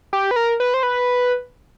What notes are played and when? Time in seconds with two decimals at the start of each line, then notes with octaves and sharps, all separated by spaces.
0.13 G4
0.31 B4
0.36 A#4
0.60 B4
0.74 C5
0.83 B4